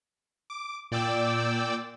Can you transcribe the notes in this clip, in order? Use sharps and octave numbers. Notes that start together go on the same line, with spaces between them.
D6
A#2 D5 G5 D6 E6